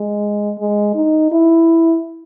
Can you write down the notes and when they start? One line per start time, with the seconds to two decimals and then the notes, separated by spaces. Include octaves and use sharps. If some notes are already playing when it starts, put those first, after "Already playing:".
Already playing: G#3
0.59 G#3
0.95 D#4
1.32 E4